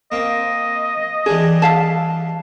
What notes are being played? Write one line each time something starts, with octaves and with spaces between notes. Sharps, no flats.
A#3 C4 D#5
E3 G3 D4 G#4
E5 F5 A5